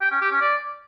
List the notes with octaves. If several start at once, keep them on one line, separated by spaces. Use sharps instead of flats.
G5
C#4
G4
C#4
D5